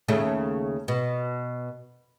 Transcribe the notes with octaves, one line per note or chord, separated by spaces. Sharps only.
D#2 C#3 A3
B2